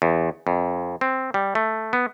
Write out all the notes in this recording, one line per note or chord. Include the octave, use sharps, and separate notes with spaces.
E2
F2
C4
G3
A3
B3